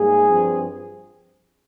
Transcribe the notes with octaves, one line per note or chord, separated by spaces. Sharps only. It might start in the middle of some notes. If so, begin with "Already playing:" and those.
Already playing: G#2 G3 A#3 G#4
G2 F3 C4